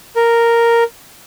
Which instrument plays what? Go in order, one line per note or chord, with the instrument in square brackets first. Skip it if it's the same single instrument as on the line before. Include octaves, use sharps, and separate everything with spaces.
[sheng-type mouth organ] A#4